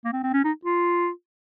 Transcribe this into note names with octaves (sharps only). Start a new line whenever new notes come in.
A#3
C4
C4
C#4
D#4
F4